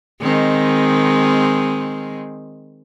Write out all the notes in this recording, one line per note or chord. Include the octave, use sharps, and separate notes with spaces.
D#3 G#3 C4